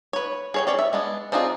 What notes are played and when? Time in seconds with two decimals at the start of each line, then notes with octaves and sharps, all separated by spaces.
0.13 B4 C#5
0.54 G#4 C#5 G5
0.67 C#4 F#4 C#5 D5 G5
0.79 E5
0.93 G#3 B3 D4
1.32 C4 D4 D#4 F4 G#4